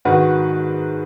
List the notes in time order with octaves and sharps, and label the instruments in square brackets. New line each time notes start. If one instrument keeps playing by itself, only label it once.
[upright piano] G#2 D#3 F#4 B4